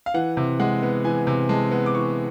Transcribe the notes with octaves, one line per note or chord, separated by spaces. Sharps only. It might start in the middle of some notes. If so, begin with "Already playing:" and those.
F5
E3 F#5
C3
G#3 F#5
B3
E3 G#5
C3
G#3 A5
B3
D6
E3 C#6